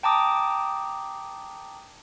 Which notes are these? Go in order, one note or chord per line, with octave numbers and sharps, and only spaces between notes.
G5 A5 A#5 D6 D#6